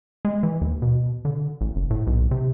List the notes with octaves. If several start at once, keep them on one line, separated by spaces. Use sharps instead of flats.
G#3
E3
D#2
B2
D3
A1
F#1
A2
B1
C3